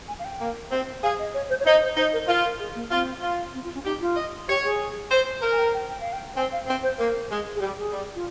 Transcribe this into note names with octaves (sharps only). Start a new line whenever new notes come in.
G#5
F5
G5
A#3
C4
G#4 F5
D#5
C#5
C5
C#5
D#4 C5
C5
D#4 C5
A#4
F4 A#4
A#4
G#4
A#3
C4 F4
F4
C4
F4
C#4
D#4 G4
F4
D#5
G4 C#5
G#4
C5
A#4 C5
G#5
G5
G5
G5
F5
G5
C4 G#5
F5
C4
C5
A#3 A#4
G#3 G#4
G#4
G3 G4
G#4
G3
F4